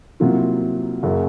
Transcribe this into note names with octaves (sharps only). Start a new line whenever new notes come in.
C2 C3 F#3 A#3 F4
F#1 F#2 C#3